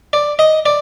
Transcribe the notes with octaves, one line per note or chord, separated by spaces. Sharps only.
D5
D#5
D5